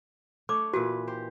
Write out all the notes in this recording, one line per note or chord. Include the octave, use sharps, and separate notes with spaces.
A3 D4 C#5 D6
A#2 E3 F#4 B4
G4 C5